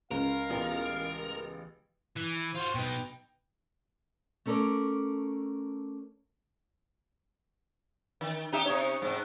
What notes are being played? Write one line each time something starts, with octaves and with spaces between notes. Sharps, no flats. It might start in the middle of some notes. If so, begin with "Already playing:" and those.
C#2 A#4 F5
A1 B3 F4
E3
F4 F#4 C5
B2 D#4 B4 G5
A3 C#4 A4 A#4 D5
D#3
D#4 G4 E5
C3 D#4 C#5
G#2 C3